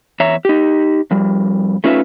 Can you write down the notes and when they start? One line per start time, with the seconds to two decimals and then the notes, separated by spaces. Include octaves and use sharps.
0.20 E2 C#5 E5 A#5
0.45 D#4 G4
1.11 F2 G3
1.84 A3 C#4 D#4 F4 B4 E5